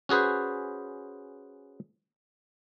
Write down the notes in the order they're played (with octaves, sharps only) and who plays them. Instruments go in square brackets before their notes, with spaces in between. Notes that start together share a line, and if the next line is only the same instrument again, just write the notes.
[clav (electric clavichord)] C#4 F#4 G#4 B4 C5